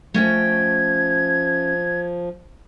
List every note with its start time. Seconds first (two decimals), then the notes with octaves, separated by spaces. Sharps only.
0.14 F3 A3 C#4 G5 G#6